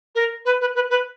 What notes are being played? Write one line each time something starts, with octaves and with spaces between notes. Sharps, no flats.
A#4
B4
B4
B4
B4